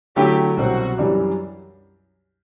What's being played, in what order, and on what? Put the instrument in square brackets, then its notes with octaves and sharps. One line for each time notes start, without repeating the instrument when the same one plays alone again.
[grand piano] D3 F#3 A3 E4 [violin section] G4
[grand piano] C2 B2 F#3 C4 [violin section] F#4
[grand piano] F#2 E3 G3 D4 G4